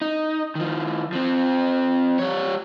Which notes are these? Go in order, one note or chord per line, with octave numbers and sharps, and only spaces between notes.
D#4
D#3 F3
F3 C4
G3 C#5